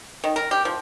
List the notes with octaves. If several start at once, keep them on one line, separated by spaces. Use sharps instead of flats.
D#3
A#4
G4
F3